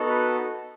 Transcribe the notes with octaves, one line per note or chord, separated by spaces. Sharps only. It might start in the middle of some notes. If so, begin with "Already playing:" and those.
Already playing: B3 D#4 F#4 A4
B4